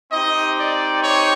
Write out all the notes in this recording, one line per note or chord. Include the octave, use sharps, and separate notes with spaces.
C4 D#4 G4 D#5
D5
C#5